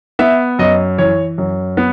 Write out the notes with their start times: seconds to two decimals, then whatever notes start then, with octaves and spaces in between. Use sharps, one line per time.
0.19 B3 E5
0.59 F#2 D#5
0.98 E3 C#5
1.38 F#2
1.77 B3